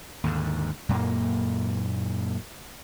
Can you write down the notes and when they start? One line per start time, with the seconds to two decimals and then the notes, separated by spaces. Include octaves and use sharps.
0.24 D#2 G#2 D3
0.89 F#2 A#2 A#3